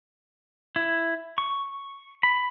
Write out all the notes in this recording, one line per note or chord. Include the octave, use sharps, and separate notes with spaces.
E4
C#6
B5